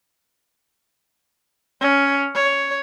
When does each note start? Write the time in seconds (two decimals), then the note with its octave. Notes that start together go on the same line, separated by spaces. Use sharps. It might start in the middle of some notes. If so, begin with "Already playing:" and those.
1.81 C#4
2.35 C#5